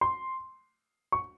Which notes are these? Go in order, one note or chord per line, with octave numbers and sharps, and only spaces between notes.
C6
C#6